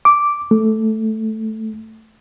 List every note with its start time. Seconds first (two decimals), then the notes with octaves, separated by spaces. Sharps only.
0.05 D6
0.51 A3